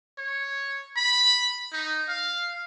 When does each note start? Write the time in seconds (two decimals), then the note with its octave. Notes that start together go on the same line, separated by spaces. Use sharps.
0.18 C#5
0.96 B5
1.73 D#4
2.08 F5